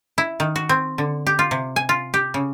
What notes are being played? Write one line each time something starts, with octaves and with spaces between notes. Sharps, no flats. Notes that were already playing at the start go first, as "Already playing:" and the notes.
E4
D#3
F#4
C4
D3
G4
F4
C3
G#5
F4
G4
C#3